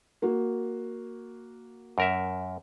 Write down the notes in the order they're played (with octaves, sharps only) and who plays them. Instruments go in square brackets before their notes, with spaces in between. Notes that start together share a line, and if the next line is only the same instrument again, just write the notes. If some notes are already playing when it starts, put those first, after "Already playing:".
[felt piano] A#3 F#4
[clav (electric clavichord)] F#2 A#4 E5